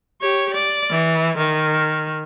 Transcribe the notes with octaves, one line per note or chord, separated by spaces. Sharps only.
G4 C#5
D5
E3
D#3